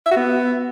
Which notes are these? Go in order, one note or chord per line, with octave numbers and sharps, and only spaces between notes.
E5
F#4
B3